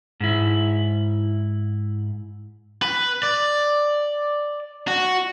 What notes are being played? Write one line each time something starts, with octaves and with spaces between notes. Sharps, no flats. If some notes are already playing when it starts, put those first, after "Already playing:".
G#2 E4
B4
D5
F#4